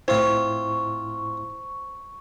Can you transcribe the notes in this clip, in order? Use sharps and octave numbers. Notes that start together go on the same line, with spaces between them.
A2 C4 E4 F4 C5 C#6